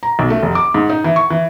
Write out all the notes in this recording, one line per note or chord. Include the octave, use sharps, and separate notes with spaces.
A#5
B1
A3
F1
D6
G#2
D#4
E3
C#6
E3